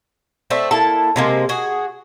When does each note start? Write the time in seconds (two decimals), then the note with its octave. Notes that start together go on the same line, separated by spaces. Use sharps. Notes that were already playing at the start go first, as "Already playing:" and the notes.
0.50 A3 C4 D5 E5
0.71 A#3 E4 A4 A5
1.16 C3 G#3 A#3
1.49 F#4 G#4